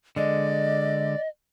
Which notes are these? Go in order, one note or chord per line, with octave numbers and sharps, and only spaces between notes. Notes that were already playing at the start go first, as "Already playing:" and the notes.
D3 G#3 D5 D#5